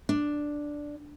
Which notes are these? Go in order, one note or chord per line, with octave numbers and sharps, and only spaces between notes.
D4